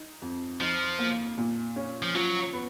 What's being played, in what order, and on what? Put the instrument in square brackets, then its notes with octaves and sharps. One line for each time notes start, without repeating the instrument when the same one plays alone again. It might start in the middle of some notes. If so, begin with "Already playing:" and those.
Already playing: [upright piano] D#4
F2
[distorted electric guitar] F3 [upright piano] D#4
[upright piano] A#3
A#2
C#4
[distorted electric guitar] F3
[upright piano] F3 [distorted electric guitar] F#3
[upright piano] B3